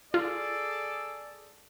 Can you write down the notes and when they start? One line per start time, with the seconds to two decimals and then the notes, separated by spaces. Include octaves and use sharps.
0.14 F4 G#4 A4 D5